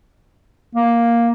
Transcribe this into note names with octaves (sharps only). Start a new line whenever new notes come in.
A#3